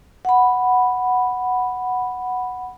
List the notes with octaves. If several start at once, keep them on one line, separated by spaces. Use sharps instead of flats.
F#5 B5